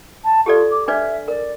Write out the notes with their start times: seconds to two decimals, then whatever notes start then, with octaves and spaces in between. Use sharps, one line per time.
0.24 A5
0.46 F4 G4 A4 D5
0.71 D6
0.88 D4 B4 D5 E5
1.28 A#4 D5